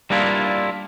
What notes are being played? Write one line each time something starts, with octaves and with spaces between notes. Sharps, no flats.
G3 A#3 D4 E4 F4